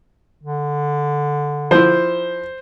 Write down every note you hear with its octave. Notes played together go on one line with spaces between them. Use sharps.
D3
F3 E4 C5